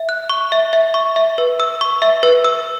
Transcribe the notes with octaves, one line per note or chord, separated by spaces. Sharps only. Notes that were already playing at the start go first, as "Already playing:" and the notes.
Already playing: E5
F#6
C#6
E5
E5
C#6
E5
B4
E6
C#6
E5
B4
E6